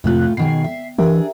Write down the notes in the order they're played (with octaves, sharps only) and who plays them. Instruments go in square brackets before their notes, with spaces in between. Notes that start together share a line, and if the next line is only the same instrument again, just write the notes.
[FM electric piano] F2 C3 F#6 [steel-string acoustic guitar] A2 A3 F4
[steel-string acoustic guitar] B2 D#3 G#4 [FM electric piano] C7
[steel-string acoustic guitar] E5
[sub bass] E3 [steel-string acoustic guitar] D4 G#4 [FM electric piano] G4 A#4 E5